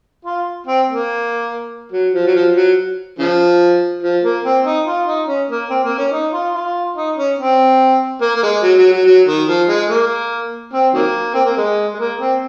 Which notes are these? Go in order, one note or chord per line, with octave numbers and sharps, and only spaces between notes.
F4
C4
A#3
F#3
F3
F#3
F3
F#3
C#3 F3
F3
A#3
C4
D#4
F4
D#4
C#4
A#3
C4
A#3
C#4
D#4
F4
F4
D#4
C#4
C4
A#3
A#3
G#3
F#3
F#3
F#3
F#3
D#3
F3
G#3
A#3
C4
D#3 F#3 A#3
C4
A#3
G#3
G#3
A#3
C4